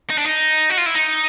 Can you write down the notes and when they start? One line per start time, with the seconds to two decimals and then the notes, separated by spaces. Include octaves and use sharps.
0.10 D#4
0.18 D4
0.26 D#4
0.70 F#4
0.78 F4
0.86 E4
0.95 D#4